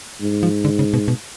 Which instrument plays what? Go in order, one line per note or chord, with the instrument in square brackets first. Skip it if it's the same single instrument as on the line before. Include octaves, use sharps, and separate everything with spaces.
[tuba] G#2
[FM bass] F3
D3
C#3
B2
B2